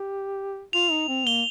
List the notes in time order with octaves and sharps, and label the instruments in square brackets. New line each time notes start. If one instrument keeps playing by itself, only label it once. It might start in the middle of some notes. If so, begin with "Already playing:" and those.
Already playing: [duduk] G4
[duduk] F4 [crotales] F7
[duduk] D#4
C4
[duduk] A#3 [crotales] G7